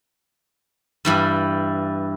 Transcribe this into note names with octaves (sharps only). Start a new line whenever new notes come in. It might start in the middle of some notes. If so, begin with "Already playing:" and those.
G2 E3 G3